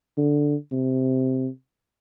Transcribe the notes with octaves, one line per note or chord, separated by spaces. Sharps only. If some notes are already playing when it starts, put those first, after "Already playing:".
D3
C3